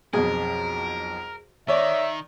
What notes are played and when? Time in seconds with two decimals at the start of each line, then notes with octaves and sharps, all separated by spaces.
0.13 B1 F2 G#4 A#4
1.68 D#3 C#5 D5 E5